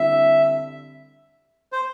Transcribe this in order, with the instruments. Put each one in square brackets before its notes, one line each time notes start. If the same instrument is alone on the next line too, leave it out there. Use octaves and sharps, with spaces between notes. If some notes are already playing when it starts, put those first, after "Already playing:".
Already playing: [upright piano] D3 G3 C4 E4 [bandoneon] E5
[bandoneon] C5